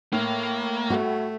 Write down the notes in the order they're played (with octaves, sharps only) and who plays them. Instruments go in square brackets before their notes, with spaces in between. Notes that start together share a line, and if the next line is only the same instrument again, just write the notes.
[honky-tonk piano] A2 [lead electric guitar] A#3
[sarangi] A3 [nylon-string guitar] F#4